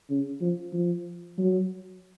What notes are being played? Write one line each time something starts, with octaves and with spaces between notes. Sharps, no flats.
C#3
F3
F3
F#3